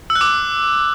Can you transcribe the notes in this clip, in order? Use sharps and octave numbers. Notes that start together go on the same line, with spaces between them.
E6
F#6
D6